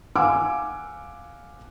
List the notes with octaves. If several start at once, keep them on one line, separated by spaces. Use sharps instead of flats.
F5 F#5 G#5 D6 E6